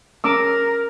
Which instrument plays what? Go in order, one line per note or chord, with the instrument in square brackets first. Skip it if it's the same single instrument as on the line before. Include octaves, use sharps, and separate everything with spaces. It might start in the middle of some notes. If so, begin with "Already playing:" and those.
[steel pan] C#4 D6 E6 [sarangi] A#4